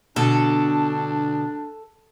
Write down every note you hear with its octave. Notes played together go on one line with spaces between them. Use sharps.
B2 D3 D4 A4